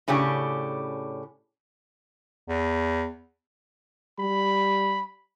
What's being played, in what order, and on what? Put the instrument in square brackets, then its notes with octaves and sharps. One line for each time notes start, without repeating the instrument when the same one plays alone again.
[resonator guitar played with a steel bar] A2 C#3 C#4 D4 G4
[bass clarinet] E2
[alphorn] G3 [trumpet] B5